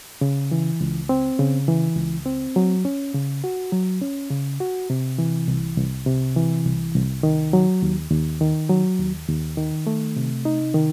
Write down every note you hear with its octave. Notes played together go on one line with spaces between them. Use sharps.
C#3
E3
C#2
C4
C#3
E3
C#2
C4
F#3
C#4
C#3
F#4
F#3
C#4
C#3
F#4
C3
E3
C2
C2
C3
E3
C2
C2
D#3
F#3
D#2
D#2
D#3
F#3
D#2
D#2
D#3
A3
C3
D#4
D#3